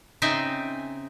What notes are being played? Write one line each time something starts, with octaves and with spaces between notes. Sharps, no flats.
C#3 C4 D#4 E5 G5 G#5